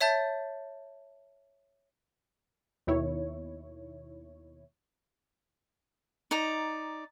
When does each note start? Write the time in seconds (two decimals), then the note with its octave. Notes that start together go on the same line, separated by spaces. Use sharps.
0.01 C#5 E5 A5 G6 A6
2.87 D#2 B2 D#3 E4 C#5
6.31 D#4 D5 A#5